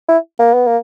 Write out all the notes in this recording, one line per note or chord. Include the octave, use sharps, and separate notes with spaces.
E4
A#3
B3
A#3